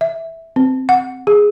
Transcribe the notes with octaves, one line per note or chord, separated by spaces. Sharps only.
E5
C4
F#5
G#4